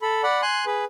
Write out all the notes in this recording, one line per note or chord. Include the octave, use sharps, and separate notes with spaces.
A4 B5
D5 F#5 B5
G#5 C6 F#6
G#4 B4